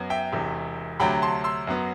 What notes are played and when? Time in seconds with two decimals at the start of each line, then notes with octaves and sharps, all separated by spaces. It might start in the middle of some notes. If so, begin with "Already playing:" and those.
Already playing: F#2 F#3 B3
0.10 E5 G5
0.32 E1 E2 C3
1.00 D2 C3 F#3 G5 B5
1.22 A5 C6
1.44 C6 E6
1.67 F#2 F#3 B3